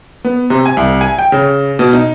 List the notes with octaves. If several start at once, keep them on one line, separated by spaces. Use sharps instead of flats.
B3
C3
G#5
C2
G#5
G5
C#3
B2
D#4